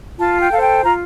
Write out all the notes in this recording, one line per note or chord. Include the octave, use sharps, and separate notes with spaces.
F4 A5
G5
A4 C5 F5
G5
F4 A#5